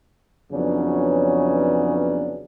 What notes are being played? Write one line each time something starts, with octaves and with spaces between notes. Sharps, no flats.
F2 C#3 E3 F#3 B3 D4